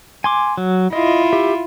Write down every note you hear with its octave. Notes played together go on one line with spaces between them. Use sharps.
G#5 C6 D6
F#3
E4 F4 D#5
G4 E5